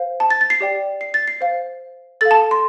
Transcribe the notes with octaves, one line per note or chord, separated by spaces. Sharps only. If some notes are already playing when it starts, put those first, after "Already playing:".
Already playing: C5 F5
A5
A6
A6
C7
G4 D5 G5
C7
A6
C7
C5 F5
A4 F5 A6
A5
C6